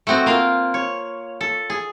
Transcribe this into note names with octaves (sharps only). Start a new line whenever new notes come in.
A3 B3 C4 F#4
A#3 F4 F5
C#5
A4
G#4